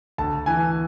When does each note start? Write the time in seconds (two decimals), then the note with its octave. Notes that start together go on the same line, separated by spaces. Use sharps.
0.18 D2 A5
0.46 E3 G#5